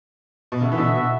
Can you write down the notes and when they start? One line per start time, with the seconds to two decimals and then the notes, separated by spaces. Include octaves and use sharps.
0.52 B2
0.61 C#3 B3 F#4 A4 E5
0.72 E3
0.78 B2 D3
0.96 B2